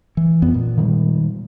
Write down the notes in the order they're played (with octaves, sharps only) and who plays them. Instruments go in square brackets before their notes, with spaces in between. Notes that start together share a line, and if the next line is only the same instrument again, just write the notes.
[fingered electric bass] E3
F2 B3
A#2
[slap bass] D#3 G3 G#3